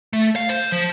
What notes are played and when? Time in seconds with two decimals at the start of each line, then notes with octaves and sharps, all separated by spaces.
0.13 A3
0.36 F5
0.49 C5
0.72 F3